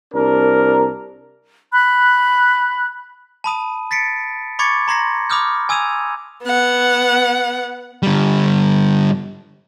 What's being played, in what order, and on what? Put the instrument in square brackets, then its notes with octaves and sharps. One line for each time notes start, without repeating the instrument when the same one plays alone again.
[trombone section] C2 D4 A#4
[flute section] B5 F#6
[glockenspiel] A5 B5 D#6 D#7
A6 B6 C#7 D7
B5 C#6 D6 G#6 A6 C#7
A#5 C6 G#6 A#6 C7
B5 D6 D#6 F6 G6
G#5 D#6 E6 G#6 D#7 F7
[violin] B3 F#5
[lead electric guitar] D3 G3